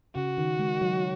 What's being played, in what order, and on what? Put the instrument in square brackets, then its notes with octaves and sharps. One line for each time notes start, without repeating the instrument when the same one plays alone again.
[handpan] C#3 [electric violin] F#4
[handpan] D#3
G#3
F#3